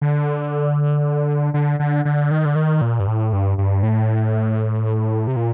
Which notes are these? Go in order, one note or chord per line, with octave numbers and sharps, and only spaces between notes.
D3
D3
D3
D3
D#3
D3
D#3
A#2
G2
A2
G2
G2
A2
C3
A#2